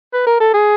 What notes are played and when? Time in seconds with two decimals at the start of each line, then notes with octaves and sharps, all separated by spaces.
0.13 B4
0.27 A#4
0.40 A4
0.54 G#4